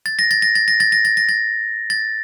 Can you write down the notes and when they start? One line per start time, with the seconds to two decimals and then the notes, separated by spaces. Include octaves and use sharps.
0.06 A6
0.19 A#6
0.31 A6
0.42 A#6
0.55 A6
0.68 A#6
0.80 A6
0.92 A#6
1.05 A6
1.17 A#6
1.29 A6
1.90 A6